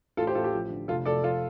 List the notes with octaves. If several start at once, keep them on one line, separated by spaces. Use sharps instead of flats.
A1 F4 A4
G4 C5
A1 F4 A4
G4
F3
D3
F1 F4 A4
F1 A4 D5
F3 F4 A4